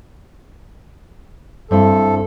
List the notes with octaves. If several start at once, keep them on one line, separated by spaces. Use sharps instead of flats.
G2 C4 E4 A4